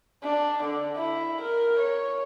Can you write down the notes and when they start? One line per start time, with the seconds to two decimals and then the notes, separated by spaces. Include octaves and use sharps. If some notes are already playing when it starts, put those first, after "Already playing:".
0.23 D4
0.64 D3
0.97 E4
1.41 A#4
1.79 C#5